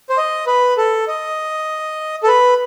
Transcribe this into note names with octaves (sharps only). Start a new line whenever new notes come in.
C5
D#5
B4
A4
D#5
A4
B4